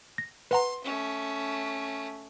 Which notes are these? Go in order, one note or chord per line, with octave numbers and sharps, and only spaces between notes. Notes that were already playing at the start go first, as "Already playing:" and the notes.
A#6
B4 F#5 A#5 C6
A3 C#4